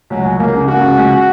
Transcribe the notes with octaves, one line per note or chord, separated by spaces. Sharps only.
C#2 F#3
C#2
C#2 A#3
C#3
C#3 F#4
C#2
C#2